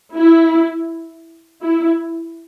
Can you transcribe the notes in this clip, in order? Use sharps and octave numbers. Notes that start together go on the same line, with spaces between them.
E4
E4